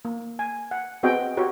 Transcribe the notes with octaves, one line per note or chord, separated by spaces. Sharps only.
A#3
G#5
F#5
B3 C4 F#4 G#4 D#5 G5
F#4 G4 C#5